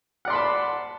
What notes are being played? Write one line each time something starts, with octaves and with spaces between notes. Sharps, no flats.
D5 F#5 A5 B5 C6